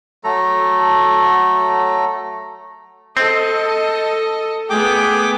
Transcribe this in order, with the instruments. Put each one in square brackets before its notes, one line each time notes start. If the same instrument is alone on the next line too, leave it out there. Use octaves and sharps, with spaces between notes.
[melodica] F#3 A3 A4 A#5
[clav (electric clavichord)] C4 [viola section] A4 D#5
[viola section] A3 B3 [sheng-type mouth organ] G#4 G5 D6